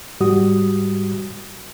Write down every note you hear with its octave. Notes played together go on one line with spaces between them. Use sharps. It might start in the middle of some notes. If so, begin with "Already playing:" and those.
G#2 G3 F#4 D#6